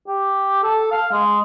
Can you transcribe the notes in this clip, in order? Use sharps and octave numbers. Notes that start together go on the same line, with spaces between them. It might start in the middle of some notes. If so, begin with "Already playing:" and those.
G4
A4
F5
G#3